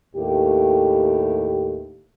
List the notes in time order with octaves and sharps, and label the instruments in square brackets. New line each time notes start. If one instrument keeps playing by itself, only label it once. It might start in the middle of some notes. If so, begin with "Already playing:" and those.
[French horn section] D#2 A2 G4